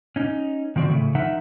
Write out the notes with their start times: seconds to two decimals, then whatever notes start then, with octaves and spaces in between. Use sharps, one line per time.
0.16 C#4 D#4
0.76 D#3 F3 C4 F#4 D5
0.88 A2 C#3 A3
1.15 F3 D#4 A#4 E5 F#5